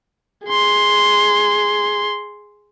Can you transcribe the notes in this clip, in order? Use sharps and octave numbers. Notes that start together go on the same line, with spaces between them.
G#4 C6